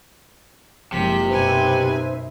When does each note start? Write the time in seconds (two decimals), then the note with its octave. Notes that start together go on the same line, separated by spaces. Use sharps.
0.92 F#1 C3 F3 G#3 B6
1.30 F#2 B2 D#4 B4 C5 E5 G#5